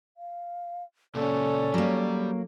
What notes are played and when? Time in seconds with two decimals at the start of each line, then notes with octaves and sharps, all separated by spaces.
0.17 F5
1.15 A#2 C#3 A#3 C#4 A4 D5
1.74 F#3 G3 A#3